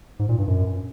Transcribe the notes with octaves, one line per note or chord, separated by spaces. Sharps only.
G#2
A#2
G2
F#2